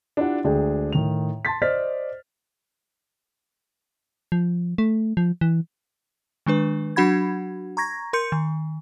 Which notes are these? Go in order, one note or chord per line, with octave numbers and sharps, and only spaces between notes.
D4 E4 F4 G4 D5 F#5
D2 G#3 D4 G#4 G5
A2 D#3 F7
A5 C6 A6 B6
C5 D5 D#5 F6 A6 B6
F3
A3
F3
E3
D#3 G#3 D4 B4
F#3 D4 F#4 F#5 B5 G#6
A#5 C#6 G#6 A#6
A#4 C6 G6 C#7
D#3